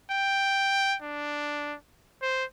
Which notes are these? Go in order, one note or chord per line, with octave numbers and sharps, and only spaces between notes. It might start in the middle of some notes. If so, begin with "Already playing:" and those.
G5
D4
C5